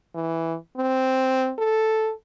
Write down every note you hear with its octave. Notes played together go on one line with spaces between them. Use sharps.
E3
C4
A4